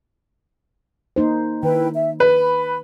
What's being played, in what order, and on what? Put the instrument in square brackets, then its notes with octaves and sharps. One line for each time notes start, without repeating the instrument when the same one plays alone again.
[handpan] A#3 D#4 C5
[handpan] D#3 [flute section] E4 B4 G5
[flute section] E5
[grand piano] B4 [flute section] B5